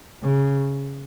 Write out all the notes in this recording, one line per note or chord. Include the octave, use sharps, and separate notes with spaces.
C#3